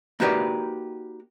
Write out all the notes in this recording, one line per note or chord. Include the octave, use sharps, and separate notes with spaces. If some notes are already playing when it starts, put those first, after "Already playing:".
A#3 D#4 F#4 G4 B4 D5